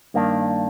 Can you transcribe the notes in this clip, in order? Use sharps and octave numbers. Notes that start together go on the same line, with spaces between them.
G2 D#3 A#3 D4